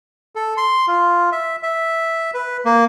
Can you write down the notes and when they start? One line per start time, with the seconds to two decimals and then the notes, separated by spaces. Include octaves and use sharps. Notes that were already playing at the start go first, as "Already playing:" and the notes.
0.35 A4
0.57 C6
0.87 F4
1.32 E5
1.63 E5
2.34 B4
2.65 A#3